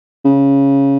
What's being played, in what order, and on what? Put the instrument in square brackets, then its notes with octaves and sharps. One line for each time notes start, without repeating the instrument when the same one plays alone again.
[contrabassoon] C#3